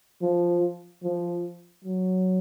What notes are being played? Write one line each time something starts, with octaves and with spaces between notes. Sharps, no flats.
F3
F3
F#3